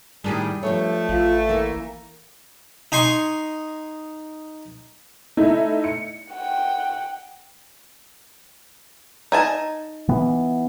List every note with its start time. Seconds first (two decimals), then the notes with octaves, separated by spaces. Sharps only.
0.24 A2 D#3 G3 D4 G4 G#4
0.63 G2 F3 A3 A4 C#5
1.09 A1 F4
1.49 E3 A#3 A#4
2.92 D#4 G#5 C6 C#6
5.37 A3 D#4 E4
5.84 C#7
6.33 F#5 G5
9.32 D#4 G#5 A5
10.08 E3 B3